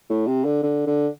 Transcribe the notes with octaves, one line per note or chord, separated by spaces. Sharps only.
A2
C3
D3
D3
D3